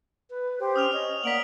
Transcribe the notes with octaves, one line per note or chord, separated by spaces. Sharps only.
B4
G4 C5
C#4 D#6 F6 F7
C#4 D#5
A#3 D5 F#5 D#6 B6 D7 F#7